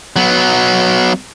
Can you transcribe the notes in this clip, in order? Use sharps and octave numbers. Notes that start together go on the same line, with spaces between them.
F#3 B3